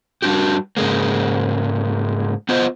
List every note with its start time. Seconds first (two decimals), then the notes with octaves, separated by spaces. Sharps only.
0.22 G3 D4 F#4 G4
0.77 G#2 C#3 G#3 A#3
2.49 B3 F4 C5 D#5